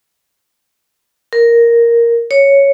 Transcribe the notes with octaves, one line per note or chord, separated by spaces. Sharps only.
A#4
C#5